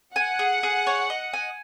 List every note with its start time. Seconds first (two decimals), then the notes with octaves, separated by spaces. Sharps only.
0.15 F#5 G#5
0.39 G#4
0.63 G#4
0.87 C#5
1.10 D#5
1.33 G#5